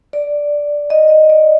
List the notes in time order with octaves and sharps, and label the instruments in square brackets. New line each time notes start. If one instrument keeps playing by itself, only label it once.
[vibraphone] D5
D#5
D#5
D5